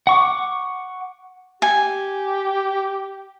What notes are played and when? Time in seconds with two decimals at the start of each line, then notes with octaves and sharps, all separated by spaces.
0.07 F#5 C#6 D6
1.62 G4 G#5